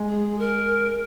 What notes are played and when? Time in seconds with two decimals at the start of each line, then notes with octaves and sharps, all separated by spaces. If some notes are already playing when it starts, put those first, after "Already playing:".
Already playing: G#3
0.09 G#4
0.39 A#4